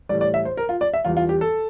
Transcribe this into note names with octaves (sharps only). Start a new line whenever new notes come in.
A2 E3 G3 D5
D5
E5
C5
A#4
F4
D5
E5
E2 E3 G3 F4
F4
G4
A4